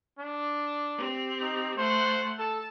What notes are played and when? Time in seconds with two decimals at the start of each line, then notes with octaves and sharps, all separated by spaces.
0.19 D4
0.98 C4 G4
1.41 D#4
1.78 A3 C5 F#5
2.39 A4 A5